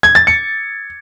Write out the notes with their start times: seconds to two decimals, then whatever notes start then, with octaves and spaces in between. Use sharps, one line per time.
0.03 G#6
0.15 A6
0.27 C#7